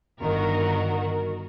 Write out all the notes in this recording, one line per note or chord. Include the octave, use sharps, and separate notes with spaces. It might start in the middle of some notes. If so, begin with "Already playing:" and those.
G1 D#3 F#4 A#4